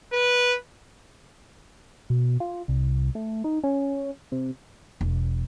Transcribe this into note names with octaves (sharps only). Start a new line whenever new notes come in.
B4
B2
F4
C2
A3
D#4
C#4
C3
E1